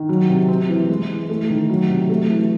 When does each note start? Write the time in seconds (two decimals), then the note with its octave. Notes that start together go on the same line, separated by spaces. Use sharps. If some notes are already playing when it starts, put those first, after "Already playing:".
Already playing: D#3
0.09 F#3
0.29 C3
0.48 C4
0.69 E3
0.89 G#3
1.09 E3
1.29 A3
1.50 D#3
1.69 F#3
1.89 C3
2.10 A3
2.30 E3